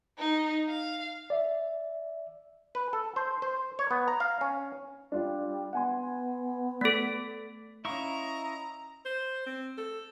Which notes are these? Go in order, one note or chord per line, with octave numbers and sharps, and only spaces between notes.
D#4
F5
D5 E5
B4
A4
C5
C5
C#5
B3
A#5
F5
C#4
G3 D4 F4
B3 F#5 G#5 C6
A3 A4 A6 B6
C#4 E4 D#5 F5 A#5 C6 C#6
C5
C4
A4